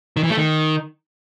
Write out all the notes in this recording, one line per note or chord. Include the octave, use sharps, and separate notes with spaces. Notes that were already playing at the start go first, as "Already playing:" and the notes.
D#3
E3
A3
D#3